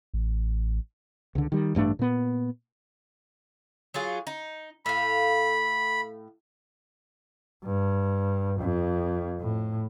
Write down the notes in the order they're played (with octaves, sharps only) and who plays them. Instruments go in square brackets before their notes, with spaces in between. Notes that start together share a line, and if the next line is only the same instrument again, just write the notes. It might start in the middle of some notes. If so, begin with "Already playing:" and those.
[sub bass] A1
[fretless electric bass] C#2 D3
D#3 G3
A1 G2 A3 D4
A#2 B3
[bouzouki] F#3 F4 G#4
D#4
[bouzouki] A2 F5 [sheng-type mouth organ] B5
[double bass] G2
F2
A2